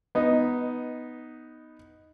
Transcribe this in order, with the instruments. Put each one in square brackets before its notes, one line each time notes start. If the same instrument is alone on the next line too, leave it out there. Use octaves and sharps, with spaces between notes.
[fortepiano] B3 D#4